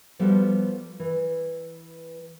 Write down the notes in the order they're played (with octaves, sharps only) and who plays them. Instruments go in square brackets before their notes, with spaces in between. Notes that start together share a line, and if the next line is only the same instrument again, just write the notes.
[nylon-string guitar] F3 G3 B3 F#4 A4 E5
E3